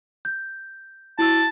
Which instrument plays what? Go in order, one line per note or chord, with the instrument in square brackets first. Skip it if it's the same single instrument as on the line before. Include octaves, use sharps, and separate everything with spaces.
[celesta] G6
[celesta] E4 F#4 E6 [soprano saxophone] A5